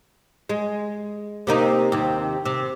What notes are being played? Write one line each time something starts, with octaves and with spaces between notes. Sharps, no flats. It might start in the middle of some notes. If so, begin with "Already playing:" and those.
G#3
C3 A#3 D#4
D#2 C3
C3